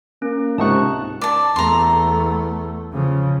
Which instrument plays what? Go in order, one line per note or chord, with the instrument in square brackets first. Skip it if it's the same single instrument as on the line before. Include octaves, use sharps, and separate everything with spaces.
[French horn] A#3 [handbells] C#4
[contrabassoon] C#2 [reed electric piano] G#2 D#4 C#6 [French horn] C3 [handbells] A5 F#6
[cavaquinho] D5 A5
[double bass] E2 A3 [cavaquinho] A#5 C6
[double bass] C#3 F3